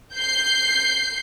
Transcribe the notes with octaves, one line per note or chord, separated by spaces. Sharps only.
G6 C7